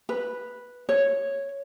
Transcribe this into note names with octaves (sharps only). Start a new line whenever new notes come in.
B4
C#5